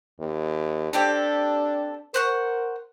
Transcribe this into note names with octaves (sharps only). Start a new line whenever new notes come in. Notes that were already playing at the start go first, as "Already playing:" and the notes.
D#2
C4 D4 G4 A4
A#4 C5 F#5 C#6